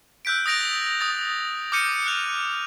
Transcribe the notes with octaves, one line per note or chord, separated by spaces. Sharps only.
E6 F#6 G6 B6 D7
D#6 A6 A#6 D7 F7
D7
D#6 A6
D6 F6 G6 C#7 D#7
F6 F#6 C#7 F7